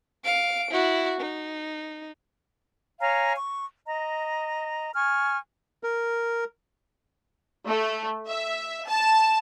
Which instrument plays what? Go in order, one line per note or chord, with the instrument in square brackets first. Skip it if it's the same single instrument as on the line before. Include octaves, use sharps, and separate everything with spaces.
[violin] F5 D7
E4 F#4
D#4
[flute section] C#5 F5 G#5 A#5
C#6
D#5 A#5
G#5 C#6 F6
[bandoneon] A#4
[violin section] A3
E5
A5